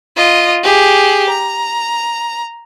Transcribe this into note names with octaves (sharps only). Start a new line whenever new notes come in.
F4 D#5
G4 G#4
A#5